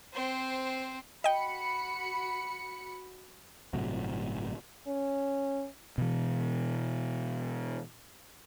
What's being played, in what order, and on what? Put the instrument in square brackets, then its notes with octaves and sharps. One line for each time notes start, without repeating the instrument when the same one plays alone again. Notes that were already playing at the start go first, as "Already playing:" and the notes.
[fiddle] C4 C5
[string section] F#4 B5 C#7 [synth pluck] D#5 G5
[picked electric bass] G1 A2 C3 F#3
[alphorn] C#4
[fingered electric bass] B2 E3